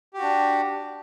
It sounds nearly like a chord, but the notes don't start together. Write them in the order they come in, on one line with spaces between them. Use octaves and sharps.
G4 F#4 D4